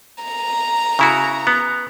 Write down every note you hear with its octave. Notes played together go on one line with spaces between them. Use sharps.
A#5
C#3 E4 F#4
B3